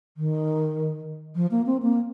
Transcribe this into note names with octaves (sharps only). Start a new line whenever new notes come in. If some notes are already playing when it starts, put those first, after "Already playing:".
D#3
F3
A#3
C4
A#3